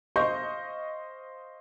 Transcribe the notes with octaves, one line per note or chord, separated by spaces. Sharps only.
C5 D#5 F5 C6 C#6 G6